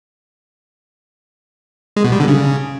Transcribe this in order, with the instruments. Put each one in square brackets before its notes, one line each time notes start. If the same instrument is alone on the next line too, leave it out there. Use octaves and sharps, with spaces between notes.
[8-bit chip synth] G#3
B2
G3
D3
C#3